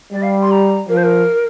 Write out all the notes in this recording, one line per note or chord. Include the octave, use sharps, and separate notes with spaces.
G3 D5
F5
C6
A#5
F3 A#4
C5
A#4